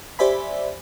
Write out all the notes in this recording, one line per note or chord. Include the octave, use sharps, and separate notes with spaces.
G4 C5 D5 E5 G#5 B5